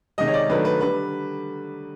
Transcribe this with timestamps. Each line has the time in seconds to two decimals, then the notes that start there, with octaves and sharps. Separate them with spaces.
0.18 C3 D#3 G#3 D#5
0.28 C#5
0.34 D5
0.49 D#3 F#3 A3 D4 B4
0.65 B4
0.81 D3 G3 B4